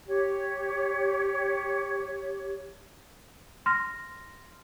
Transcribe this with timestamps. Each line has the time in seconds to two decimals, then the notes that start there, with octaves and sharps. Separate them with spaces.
0.07 G4 C#5
3.66 C6 F6 A#6